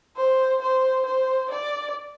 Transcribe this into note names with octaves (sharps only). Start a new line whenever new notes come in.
C5
C5
C5
D5